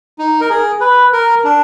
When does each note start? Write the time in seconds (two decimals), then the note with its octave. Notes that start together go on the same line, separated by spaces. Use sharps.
0.19 D#4
0.41 A#4
0.50 G#4
0.81 B4
1.13 A#4
1.44 D4